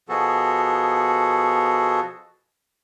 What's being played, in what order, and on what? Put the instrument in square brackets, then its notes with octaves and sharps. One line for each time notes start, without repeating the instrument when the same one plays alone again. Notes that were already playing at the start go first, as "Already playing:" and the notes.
[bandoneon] B2 F3 B3 F#4 G#4 A4